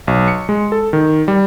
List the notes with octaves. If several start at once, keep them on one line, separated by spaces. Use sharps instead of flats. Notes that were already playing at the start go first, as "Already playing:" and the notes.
B1
C#7
G#3
A4
D#3
G3